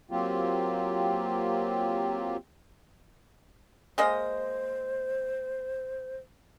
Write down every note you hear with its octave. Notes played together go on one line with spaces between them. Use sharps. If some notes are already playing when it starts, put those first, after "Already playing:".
F#3 A#3 C4 F4 G4
G#3 A#3 C5 D#5